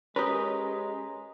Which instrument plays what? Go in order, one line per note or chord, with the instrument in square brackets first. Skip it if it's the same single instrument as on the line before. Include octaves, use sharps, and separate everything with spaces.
[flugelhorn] G#3 [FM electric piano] C#4 [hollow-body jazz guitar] G4 A#4 B4 [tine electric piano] A#5 D#6